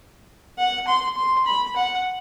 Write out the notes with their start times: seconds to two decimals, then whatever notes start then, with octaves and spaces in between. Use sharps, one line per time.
0.58 F#5
0.87 C6
1.17 C6
1.46 B5
1.76 F#5